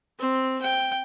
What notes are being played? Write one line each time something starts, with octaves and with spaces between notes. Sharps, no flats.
C4
G5